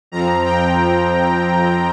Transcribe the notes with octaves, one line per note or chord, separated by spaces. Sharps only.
F2 F3 C4 A#5
G5